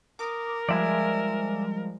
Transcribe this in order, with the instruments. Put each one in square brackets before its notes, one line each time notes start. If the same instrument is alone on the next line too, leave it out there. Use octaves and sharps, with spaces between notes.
[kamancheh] A#4 [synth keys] D6 D#6
[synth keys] F3 G3 G#3 [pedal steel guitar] D5 E5 G#5